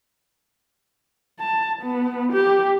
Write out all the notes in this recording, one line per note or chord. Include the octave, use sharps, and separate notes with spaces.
A5
B3
G4